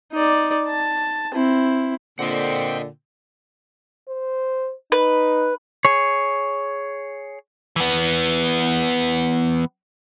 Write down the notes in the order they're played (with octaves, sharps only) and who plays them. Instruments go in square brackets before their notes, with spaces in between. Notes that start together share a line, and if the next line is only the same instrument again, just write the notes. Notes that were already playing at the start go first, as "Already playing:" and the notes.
[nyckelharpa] D#4 D5
A5
C4 E4
[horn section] A#2 D3 [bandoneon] C4 G5 G6 [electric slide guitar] D#5 F#5
[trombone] C5
[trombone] D#4 [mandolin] B4
[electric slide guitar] G#4 C#5
[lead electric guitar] E3 B3